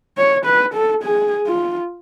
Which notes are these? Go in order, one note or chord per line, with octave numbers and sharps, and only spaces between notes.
C#5
B4
A4
G#4
F4